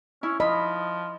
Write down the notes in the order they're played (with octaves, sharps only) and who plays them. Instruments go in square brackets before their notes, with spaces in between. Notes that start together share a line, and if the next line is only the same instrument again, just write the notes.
[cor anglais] C#4 [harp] E4
[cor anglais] F3 [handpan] D#5 [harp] B5